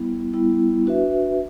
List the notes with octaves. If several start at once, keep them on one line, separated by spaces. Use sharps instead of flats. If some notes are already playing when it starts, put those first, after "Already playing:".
Already playing: G3 B3 E4
G3 B3 E4
D4 F#4 B4 E5